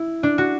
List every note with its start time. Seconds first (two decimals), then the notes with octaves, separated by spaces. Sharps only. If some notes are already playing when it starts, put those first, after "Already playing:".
Already playing: E4
0.23 D4
0.38 F#4